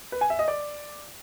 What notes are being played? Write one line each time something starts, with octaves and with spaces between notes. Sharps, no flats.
B4
G#5
E5
D#5
D5